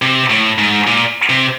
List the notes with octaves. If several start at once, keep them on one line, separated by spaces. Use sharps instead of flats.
C3
A2
G#2
A#2
C3